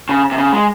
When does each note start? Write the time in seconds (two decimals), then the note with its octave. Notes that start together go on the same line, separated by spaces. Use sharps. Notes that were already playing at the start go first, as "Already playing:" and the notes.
0.09 C#3
0.32 C3
0.38 C#3
0.53 G#3